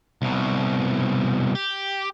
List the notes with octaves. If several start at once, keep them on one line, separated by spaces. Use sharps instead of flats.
C2 B2
G4